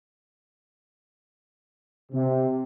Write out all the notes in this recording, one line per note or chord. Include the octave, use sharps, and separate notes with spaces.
C3